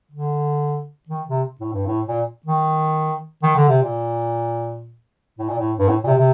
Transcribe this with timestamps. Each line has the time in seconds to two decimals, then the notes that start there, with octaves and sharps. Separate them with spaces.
0.11 D3
1.09 D#3
1.28 C3
1.60 A2
1.73 G2
1.87 A2
2.07 A#2
2.46 D#3
3.43 D#3
3.56 D3
3.69 C3
3.82 A#2
5.39 A2
5.49 A#2
5.59 A2
5.78 G2
5.88 A2
6.04 A#2
6.07 C3
6.18 C3